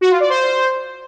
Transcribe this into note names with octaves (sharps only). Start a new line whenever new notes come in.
F#4
F4
D5
C5